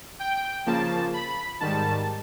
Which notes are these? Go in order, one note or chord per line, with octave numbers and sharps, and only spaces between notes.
G5
C#3 F3 A#3 A5
B5
G#2 D#3 G3 A5